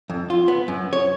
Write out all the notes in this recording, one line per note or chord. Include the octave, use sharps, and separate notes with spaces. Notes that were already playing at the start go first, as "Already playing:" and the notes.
F2
F4
B3
F#2
C#5